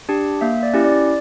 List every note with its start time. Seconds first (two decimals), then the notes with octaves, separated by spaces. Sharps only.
0.09 D4 G4
0.41 A#3 E5
0.63 D5
0.74 C#4 E4 G4
0.84 D5